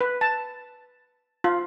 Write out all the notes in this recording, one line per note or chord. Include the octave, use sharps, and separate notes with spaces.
B4
A5
F4